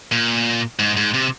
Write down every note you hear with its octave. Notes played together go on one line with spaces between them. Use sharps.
A#2
G#2
G#2
C3